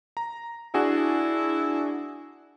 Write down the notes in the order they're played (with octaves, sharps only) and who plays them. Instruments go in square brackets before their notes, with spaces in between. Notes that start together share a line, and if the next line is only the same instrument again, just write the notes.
[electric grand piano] A#5
[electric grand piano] D4 F#4 G#4 [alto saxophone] E4